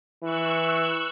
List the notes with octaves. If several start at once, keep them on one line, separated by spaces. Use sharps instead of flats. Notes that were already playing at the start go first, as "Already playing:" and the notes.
E3 C#6 E6 F#6